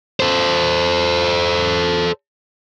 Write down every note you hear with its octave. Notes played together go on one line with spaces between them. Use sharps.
A4 C5